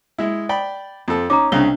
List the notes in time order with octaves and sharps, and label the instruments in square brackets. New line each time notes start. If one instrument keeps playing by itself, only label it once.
[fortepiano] G#3 E4
D5 G5 B5
F2 A4
[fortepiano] C#4 D#4 [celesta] A#5 D6
[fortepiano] C2 C#3 A#5 [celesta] D4 G7